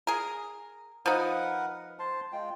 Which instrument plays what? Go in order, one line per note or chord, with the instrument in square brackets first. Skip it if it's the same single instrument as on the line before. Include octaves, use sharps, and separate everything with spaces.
[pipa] G#4 A#4
[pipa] F3 D#4 [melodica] A#4 B4 F#5
[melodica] C5 A5 C6
G#3 F4 G5